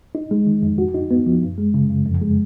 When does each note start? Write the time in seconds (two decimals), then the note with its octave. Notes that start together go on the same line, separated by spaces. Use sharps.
0.15 D#4
0.31 G#3
0.47 D#3
0.63 F2
0.78 F#4
0.95 D#4
1.11 B3
1.26 F3
1.42 F#2
1.58 G#3
1.74 C#3
1.90 F#2
2.06 F2
2.22 G#3